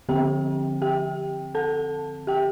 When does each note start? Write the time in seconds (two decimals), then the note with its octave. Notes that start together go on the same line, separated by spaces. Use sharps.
0.09 D3 F3 C4 G4 G5
0.82 G4 G5
1.55 A4 A5
2.27 G4 G5